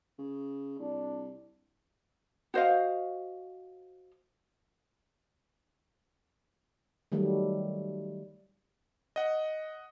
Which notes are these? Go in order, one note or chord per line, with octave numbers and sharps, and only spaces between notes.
C#3
C2 D4
F#4 C5 D#5 F5
D#3 F#3 G3 A3
D#5 F#5